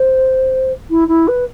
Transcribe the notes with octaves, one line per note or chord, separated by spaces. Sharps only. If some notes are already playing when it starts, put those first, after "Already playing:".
Already playing: C5
E4
E4
B4